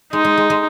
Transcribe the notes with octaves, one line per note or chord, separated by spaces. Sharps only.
G#3 D#4
G#3
G#3
G#3